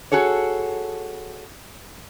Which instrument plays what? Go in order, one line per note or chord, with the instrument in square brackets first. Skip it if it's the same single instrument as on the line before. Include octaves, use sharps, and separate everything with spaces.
[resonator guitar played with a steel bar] F#4 G#4 A4 C#5